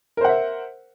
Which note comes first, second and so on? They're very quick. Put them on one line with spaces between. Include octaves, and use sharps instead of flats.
A#4 C5 F#5 E5